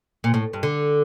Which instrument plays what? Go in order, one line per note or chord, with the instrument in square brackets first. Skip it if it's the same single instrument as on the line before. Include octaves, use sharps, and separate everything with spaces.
[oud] A#2
A2
G2
D3